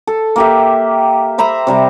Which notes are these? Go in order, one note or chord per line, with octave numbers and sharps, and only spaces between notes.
A4
A#3 G4 E5
C5 E5 A#5 B5
C3 G3 A#5